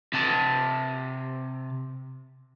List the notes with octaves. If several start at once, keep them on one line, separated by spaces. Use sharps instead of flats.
C3 A5